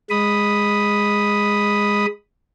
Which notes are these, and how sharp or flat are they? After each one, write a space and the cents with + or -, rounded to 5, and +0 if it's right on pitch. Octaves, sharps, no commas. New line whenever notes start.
G#3 -10 B5 +0 D#6 +0